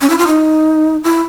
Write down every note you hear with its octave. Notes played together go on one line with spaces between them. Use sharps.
C#4
E4
F4
D#4
E4